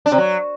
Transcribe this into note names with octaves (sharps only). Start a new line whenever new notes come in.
D4
C3
F#3